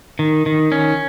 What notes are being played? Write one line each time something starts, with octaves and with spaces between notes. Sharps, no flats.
D#3
D#3
C#4